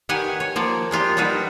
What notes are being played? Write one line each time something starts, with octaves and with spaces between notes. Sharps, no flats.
D#3 G4 B4 F#5 G#5
C#5
F3 A#3 D5
G#3 A#3 F4 G4
G3 D4 D#4 F#4 B4